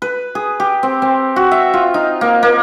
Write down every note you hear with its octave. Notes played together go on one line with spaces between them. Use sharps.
B4
G#4
G4
C4
C4
F#4
E5
F4
D#4
A#3
A#3